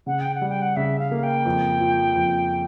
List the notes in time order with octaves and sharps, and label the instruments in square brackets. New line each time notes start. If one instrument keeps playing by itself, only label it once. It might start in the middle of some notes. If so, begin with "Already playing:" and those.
[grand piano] C#3 [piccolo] F#5
[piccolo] G5
F#5
[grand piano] G3
[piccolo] G5
F#5
[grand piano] C#3 [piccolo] E5
[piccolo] F5
[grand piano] A#3
[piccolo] G5
[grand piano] F2
F3
F2